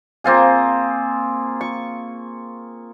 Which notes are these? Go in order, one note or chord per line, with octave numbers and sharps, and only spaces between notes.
A#3 C4 F4 G#4
C#6